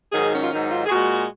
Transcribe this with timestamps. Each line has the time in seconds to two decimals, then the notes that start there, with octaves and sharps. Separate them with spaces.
0.13 G#2 D#3 F#3 G#4
0.33 C#4
0.43 F4
0.52 G#2 D#3 F#3 D#4
0.71 F4
0.86 G#4
0.91 A#2 G#3 F#4